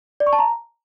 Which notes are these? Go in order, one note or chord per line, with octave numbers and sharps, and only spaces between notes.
D5
C#6
A5
A#5